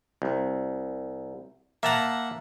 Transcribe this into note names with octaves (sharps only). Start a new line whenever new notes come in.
C2
A#3 E5 F#5 A5 A#5